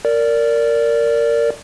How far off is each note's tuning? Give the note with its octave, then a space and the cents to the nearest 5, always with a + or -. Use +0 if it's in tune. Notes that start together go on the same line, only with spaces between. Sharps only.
A#4 -15 D5 -15